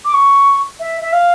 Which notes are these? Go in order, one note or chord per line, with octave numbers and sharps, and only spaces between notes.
D6
C#6
E5
E5
F5